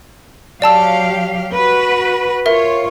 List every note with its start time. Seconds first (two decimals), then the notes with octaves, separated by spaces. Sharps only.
0.62 F#3 G4 D5 F5 A5 E6
1.53 F#4 B4
2.46 F4 A#4 C#5 E5